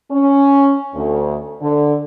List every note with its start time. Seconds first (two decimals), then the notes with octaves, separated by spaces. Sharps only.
0.11 C#4
0.94 D2
1.61 D3